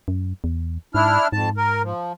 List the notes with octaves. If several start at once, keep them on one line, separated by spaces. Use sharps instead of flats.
F#2
E2
G#2 D4 E4 F6
F2 G#2 A5
A#4
F3